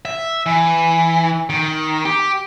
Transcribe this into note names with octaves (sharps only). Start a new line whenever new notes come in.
E5
E3
D#3
G4